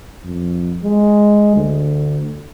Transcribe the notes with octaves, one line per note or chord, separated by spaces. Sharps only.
F2
G#3
D2